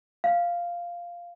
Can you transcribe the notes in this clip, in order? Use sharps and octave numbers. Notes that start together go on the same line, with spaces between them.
F5